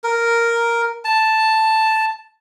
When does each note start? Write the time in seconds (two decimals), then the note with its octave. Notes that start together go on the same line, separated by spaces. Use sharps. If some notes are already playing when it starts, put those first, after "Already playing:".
0.04 A#4
1.05 A5